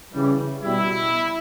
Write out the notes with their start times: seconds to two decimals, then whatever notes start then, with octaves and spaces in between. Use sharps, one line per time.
0.12 C#3 E3 G3
0.62 B2 G3 E4